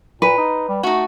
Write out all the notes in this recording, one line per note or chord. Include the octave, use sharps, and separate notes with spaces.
A#2 B4
D#4
G3
A3 D#4 F#4